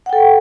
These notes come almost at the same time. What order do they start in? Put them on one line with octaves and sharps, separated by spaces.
F#5 G5 A4